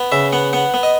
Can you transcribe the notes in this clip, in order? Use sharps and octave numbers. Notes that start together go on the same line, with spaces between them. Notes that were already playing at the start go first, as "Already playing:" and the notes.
Already playing: B3
C#3 E5
B3 F#5
B3 F#5
B3
D#5